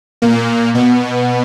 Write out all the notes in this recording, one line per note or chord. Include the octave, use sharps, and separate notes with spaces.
A#2 A#3
B2 B3